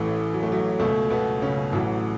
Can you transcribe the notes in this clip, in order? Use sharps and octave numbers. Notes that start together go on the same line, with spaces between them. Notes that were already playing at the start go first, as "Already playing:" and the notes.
Already playing: A1 A2 E3 A3
F#3
A3
F#3
C#2 B2 A3
B2 B3
C#3 C#4
A1 A2 E3 F#3 F#4